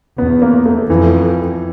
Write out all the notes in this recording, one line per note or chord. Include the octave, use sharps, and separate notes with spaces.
E2 B3
A#3
A3
F2 E3